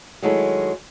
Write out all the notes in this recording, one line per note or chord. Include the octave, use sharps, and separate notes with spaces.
D#3 F#3 G#3 A3 E4 A4